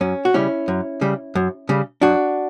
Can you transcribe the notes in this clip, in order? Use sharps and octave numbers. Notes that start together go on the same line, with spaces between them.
F#2 C#4
F#4
C#3 G3 C#4 E4
F#2
C#3 G3
F#2
C#3 G3
F#2 D4 F#4